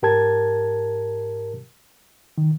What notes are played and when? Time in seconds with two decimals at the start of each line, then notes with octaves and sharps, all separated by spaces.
0.02 G#2 G4 A#4 A5 G#6
2.38 D#3